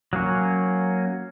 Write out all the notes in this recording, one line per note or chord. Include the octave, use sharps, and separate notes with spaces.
F#3 A#3 C#4